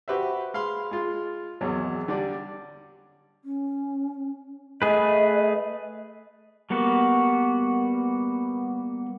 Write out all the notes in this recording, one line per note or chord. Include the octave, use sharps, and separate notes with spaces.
F#4 G4 B4 C5 E5
G#3 F5 B5 C6
G#3 F4
G#1 E2 F#3
D3 G3 D4 D5
C#4
A3 G#4 B4 D#5
G3 A#3 B3 F#4